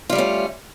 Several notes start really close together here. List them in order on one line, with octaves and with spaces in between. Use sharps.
F4 G3 A3 C#4